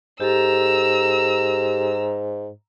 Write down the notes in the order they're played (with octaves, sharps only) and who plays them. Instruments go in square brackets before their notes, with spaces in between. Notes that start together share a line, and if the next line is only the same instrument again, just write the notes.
[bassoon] G#2 [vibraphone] G4 A4 [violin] A#5 E6